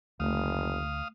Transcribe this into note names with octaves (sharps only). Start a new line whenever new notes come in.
F#1 D2 A3 F5 D#6